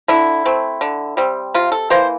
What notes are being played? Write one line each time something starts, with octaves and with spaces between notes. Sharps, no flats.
D3 E4
A3 C4
D3
G3 C4
C3 F4
A4
E3 A#3 C5